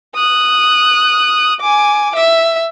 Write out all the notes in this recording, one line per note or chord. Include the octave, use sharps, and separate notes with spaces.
D#6 F#6
G#5 D6
E5